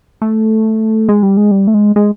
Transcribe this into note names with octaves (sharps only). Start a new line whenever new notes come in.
A3
G#3
G3
G#3
G3
A3
G#3
G#3